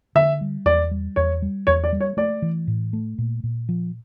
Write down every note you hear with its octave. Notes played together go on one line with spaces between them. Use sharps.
D3 E5
G3
E2 D5
G3
E2 C#5
G3
E2 C#5
D5
G3
C#5
A3 D5
E3
A2
A3
A#2
A#2
F3